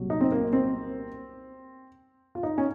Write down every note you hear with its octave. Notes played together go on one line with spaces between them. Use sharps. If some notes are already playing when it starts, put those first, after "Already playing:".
Already playing: C2 A#2 F#3
D#4
C4
A#3
C4
F4
D#4
C#4